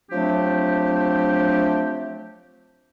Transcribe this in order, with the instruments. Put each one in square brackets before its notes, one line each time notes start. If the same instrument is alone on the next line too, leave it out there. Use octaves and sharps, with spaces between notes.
[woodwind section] F3 F#3 A3 C4 D4 G4